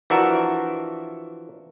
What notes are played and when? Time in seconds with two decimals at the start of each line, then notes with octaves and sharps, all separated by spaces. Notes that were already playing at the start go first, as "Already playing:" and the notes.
0.10 E3 F3 D4 F#4 A#4 E5